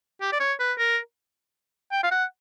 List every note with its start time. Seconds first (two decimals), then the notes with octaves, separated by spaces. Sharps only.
0.21 G4
0.32 D5
0.40 C#5
0.60 B4
0.78 A#4
1.92 G5
2.03 F5
2.11 F#5